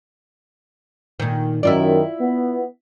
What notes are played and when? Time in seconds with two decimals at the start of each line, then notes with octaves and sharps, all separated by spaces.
1.20 A#2 D#3
1.63 F#2 D#3 E4 F4 D5
2.21 B3